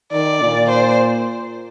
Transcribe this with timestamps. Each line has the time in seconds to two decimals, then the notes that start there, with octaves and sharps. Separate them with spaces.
0.12 D#3 D5
0.41 A#2
0.70 C5